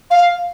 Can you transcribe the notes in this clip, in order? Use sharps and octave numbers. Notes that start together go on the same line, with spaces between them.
F5